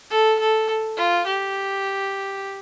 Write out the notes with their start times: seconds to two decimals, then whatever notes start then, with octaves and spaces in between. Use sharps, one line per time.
0.11 A4
0.40 A4
0.97 F4
1.26 G4